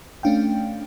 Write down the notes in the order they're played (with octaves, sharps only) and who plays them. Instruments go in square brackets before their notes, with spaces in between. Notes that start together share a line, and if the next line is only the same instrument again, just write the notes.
[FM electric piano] A3 C#4 D4 F5 G5